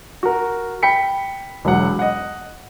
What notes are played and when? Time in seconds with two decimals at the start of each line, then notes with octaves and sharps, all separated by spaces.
0.23 F#4 A#4
0.83 G5 B5 B6 C#7
1.65 E1 F#3 F#5
1.99 D#5 F#5